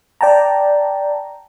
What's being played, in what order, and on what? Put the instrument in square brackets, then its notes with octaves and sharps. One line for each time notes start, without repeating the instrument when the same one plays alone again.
[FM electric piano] D5 G5 A5 A#5